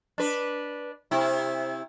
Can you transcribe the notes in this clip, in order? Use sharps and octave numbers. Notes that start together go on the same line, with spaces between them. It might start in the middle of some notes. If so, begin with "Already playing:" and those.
D4 B4
C3 E4